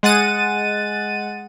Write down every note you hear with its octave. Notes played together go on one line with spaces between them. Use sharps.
G#3 F#5 A6 D#7